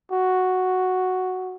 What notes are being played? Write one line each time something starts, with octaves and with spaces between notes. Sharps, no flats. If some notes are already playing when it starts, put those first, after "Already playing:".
F#4